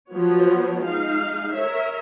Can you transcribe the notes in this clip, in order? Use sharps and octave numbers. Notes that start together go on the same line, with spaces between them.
F3 F#3 B3 F#4 C#5
G#3 D#4 F5
A#4 C#5 E5